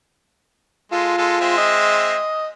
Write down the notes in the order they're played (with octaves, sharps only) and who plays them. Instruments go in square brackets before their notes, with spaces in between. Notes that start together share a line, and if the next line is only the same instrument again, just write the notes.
[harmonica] G#3 A4 [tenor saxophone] F4
[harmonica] G#3 A4
G#3 C4 E5
[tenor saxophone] D#5